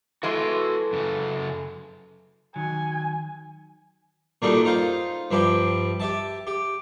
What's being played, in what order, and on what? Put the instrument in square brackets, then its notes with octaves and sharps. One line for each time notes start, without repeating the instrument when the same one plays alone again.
[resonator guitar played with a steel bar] E3 G#3 A3 [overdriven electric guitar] F#4 C6
[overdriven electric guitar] F#2 C#3
[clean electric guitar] D#3 F#3 [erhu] G#5
[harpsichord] A#2 G3 A3 D4 D#4 F#4
D#4 F4 C5 F5
G2 F3 E4 G4 G5
G4 E5 A5
G4